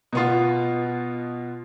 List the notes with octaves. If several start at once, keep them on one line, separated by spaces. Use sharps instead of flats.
B2 B3 F4